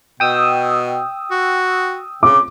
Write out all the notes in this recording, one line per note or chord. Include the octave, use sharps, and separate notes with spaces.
B2 G5 D#6 E6
F#4
C#3 D6